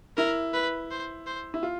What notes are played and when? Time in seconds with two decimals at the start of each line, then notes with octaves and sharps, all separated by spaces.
0.17 E4 A#4
0.54 B4
0.91 C5
1.27 C5
1.54 E4
1.63 F4